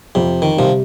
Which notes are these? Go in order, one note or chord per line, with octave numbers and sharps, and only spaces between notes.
F2 C3
D#3
C3 F3 G3